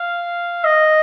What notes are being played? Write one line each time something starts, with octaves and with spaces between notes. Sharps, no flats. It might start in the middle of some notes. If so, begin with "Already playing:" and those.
Already playing: F5
D#5